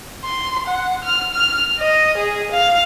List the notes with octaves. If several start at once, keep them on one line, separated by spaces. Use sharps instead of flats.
C6
F#5
F6
F6
D#5
G#4
F5